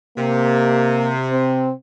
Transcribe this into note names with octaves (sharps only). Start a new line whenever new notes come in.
C3 A#3
C4